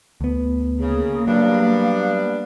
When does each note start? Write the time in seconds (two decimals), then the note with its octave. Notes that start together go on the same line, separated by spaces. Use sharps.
0.21 D2 B3
0.80 C#3 A#3 G#4
1.27 F#3 G3 B3 D4 F5